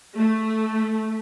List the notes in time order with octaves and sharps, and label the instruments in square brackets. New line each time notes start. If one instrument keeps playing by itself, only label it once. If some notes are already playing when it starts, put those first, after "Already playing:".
[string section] A3